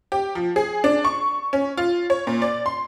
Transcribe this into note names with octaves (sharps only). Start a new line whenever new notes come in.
G4
F3
G#4
D4
C#6
C#4
F4
C#5
A#2
D5
C6